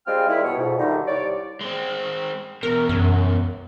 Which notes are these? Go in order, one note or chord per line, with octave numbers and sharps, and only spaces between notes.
G3 G#3 C4 F4 G5 F6
D#3 G3 G#3 E4
B2 C#5
F2 G#2 B2
D3 D#3 G3 A3 D#4
C2 C#5 D5
G#3 C4
E2 B2 A#4
F#2